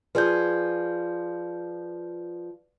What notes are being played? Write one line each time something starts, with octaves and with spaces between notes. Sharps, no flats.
F3 F4 G#4 B4 D5 G6